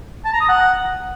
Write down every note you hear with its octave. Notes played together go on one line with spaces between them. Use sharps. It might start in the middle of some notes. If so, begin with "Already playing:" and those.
A5
A#5
D#6
F#5